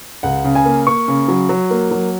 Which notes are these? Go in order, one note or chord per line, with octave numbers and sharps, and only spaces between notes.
C#2 F#5
C#3
G#5
A#3
A#3 C#6
C#3
F#3
F#3
A#3
F#3